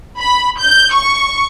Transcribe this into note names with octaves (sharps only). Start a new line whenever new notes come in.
B5
G6
C#6